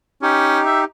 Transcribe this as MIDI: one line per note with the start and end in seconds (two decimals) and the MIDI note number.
0.22 0.60 61
0.22 0.84 63
0.22 0.84 67
0.65 0.81 76